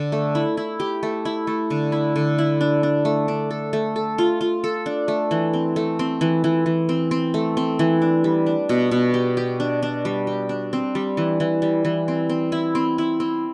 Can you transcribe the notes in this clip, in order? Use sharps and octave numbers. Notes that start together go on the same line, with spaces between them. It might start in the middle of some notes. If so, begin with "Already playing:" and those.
Already playing: D3
A3
E4
E4
G4
A3
E4
A3
D3
E4
D3
E4
D4
D4
A3
D4
A4
A3
A4
F4
F4
A4
D4
A3
E3
C4
A3
C4
E3
E3
E3
C4
C4
A3
C4
E3
D4
G3
D4
B2
B2
G4
G4
D4
D4
G3
G4
D4
C4
G3
E3
E3
G3
E3
C4
C4
E4
C4
E4
C4